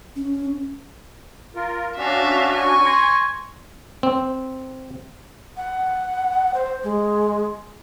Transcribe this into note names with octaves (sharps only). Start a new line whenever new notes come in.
C#4
F4 A#4
C#4 D4 F#4 E5 F5
G#5 C#6
C6 G#6 A#6
C4
F#5
C5
G#3